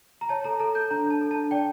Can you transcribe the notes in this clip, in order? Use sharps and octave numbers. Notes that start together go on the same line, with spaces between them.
A#5
C#5 A5
A4 A#5
A4 A#5
A4 G6
D4 A#5
D4 A5
A4
D4 A5
D5 G5